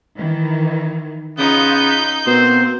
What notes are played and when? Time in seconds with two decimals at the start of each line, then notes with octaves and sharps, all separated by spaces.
0.17 D#3 E3
1.38 C#3 B3 D#4 F4 G6
2.27 B2 A#3 C4 C5